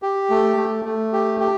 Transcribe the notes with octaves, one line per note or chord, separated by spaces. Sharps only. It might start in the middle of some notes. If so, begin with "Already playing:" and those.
G4
A3
A3
A3
G4
G4